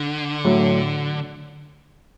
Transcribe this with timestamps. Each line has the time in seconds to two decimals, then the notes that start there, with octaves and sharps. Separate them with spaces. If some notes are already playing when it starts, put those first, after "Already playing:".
Already playing: D3
0.44 A2 F#3 A3